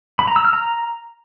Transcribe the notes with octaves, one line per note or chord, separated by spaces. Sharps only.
B5
A#5
E6
F6
A#5